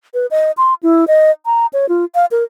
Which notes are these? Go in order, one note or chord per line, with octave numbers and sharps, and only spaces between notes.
B4
D#5
C6
E4
D#5
A#5
C#5
F4
F5
A#4